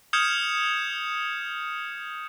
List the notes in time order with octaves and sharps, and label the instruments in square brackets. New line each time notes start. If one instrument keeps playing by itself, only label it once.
[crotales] D#6 F6 G6 G#6 C#7 E7